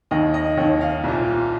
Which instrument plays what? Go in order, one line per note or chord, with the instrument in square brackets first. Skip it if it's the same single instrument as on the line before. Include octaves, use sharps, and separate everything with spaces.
[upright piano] D#2 D#3 D#5
D#5
D#2 D#3 C#5
F5
C2 A#2